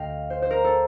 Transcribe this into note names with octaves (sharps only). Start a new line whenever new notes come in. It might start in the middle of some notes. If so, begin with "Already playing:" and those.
Already playing: D2 D3 D#5 F5 G5
C5
C5
A#4
A4